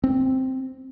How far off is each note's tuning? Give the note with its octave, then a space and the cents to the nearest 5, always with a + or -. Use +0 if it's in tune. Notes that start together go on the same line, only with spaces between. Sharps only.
C4 +0